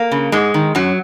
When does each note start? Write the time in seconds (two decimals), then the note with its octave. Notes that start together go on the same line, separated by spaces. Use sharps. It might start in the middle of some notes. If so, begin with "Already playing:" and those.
Already playing: A#3
0.12 C#3
0.32 G#2 G#3
0.54 D#3
0.75 F#2 F#3